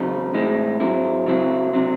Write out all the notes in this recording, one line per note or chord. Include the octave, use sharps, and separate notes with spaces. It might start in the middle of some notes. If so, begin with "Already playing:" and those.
Already playing: E2 C#3 F#3 C4 D#4
A2 E3 G#3 C4
G#2 F#3 C4 E4
C#3 F#3 C4 E4
C3 F#3 C4